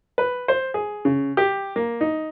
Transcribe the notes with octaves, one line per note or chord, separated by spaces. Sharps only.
B4
C5
G#4
C#3
G4
A#3
D#4